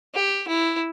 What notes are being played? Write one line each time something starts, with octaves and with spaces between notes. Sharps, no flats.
G4
E4